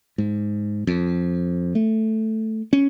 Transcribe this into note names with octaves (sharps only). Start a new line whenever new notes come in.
G#2
F2
A3
C#4